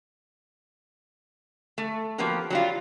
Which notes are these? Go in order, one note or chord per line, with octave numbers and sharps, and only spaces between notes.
A3
F3 F#3 A#3 B3 G4 A#4
F#3 G3 F4